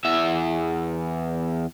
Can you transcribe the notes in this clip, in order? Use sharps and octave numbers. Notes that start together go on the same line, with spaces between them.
E2 E5